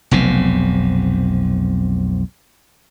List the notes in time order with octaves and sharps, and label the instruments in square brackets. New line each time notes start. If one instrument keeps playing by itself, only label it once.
[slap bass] F1 B1 C3